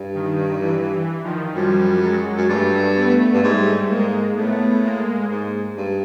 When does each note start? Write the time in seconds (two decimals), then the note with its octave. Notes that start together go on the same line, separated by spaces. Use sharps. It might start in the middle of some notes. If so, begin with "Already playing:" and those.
Already playing: G2
0.14 D#3
0.61 E3
0.93 E3
1.24 D#3 F3
1.55 F#2 F3 G3
2.01 F#3 G#3
2.37 F#2
2.49 G2 G3 A3
2.96 A3 B3
3.33 G2
3.43 G#2 G3 A3
3.89 G#2 G#3 A#3
4.36 A2 A3 B3
4.84 G#3 A#3
5.30 G#2
5.77 G2